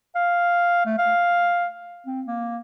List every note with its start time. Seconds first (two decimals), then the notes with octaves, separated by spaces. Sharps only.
0.16 F5
0.86 A3
0.98 F5
2.07 C4
2.27 A#3